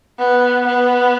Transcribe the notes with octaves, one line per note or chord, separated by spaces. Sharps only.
B3
B3